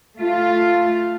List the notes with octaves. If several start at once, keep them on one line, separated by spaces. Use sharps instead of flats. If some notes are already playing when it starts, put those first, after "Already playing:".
A3 F4